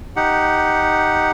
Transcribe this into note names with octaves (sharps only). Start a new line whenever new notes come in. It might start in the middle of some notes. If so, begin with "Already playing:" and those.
D#4 G4 F#5